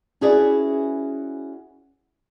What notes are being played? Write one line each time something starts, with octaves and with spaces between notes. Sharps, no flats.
C#4 E4 F#4 G#4 B4 D5